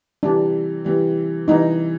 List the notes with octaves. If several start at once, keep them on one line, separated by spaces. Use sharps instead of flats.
C3 E3 G3 D4
C3 E3 G3
C3 E3 G3 D#4